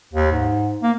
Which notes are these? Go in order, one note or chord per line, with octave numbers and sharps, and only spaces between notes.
D#2
G#2
A#3